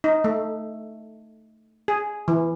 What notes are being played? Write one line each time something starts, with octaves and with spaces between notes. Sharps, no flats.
D#4
A3
G#4
E3